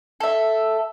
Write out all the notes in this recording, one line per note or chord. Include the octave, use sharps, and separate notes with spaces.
A4 E5